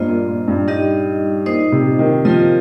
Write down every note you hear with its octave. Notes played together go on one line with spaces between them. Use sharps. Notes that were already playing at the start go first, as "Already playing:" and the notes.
Already playing: G2 A#3 F4 C5 D#5
A#2
A#2
G2
G3 D#4 G4 D#5
A#2 D#4 C5 D#5
C3
D#3
F3 F4 A#4 D#5